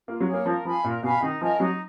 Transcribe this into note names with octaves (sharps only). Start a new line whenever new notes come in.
A#3 F4
F#3
G#4 C#5
A#3
F3 A#4
F3 F5 G#5 B5
A#2 A#4
B2 F5 G#5 B5
D#3 D#4
F3 A#4 D#5 G#5
F#3 D#4